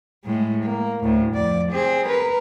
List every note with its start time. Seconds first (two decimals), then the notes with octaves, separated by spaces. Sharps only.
0.25 A2 G#3
0.64 A#3
1.03 D2 A2
1.33 F2 D5
1.72 C4 G#4
2.07 A#4 B4